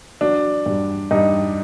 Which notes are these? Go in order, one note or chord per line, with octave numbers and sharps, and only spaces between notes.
F#3 D4
G2
G2 D#4